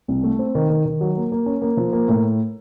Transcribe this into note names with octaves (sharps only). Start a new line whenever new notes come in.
C2
A3
C4
D#3
D#3
D#3
F#3
A#3
A#3
C#4
A#3
F3
A#3
A2